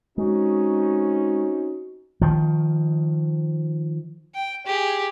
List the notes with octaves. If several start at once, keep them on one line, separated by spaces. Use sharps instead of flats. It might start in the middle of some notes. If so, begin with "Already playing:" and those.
G#3 C4 C#4 D#4 F#4
D#3 F3
G5
G4 G#4